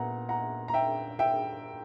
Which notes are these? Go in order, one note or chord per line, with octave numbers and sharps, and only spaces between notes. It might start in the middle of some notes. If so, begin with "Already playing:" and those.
Already playing: A#2 B3 F#5 A#5
F#5 A#5
A#5
E5 G5
E5 G5